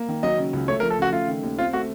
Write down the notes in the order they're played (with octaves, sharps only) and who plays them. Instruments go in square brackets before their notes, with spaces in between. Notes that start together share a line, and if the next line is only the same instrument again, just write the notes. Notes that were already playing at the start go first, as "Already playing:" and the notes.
Already playing: [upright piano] A#3
D#3
[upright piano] F#3 [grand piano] D#5
[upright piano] C#3
C#2
[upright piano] A3 [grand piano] C#5
[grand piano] A#4
[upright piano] F3
[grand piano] A4
[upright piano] C#3 [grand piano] F#4
[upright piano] A3 [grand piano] F4
[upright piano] D#3
D#2
[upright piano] C4 [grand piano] F4
[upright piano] A3 [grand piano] F#4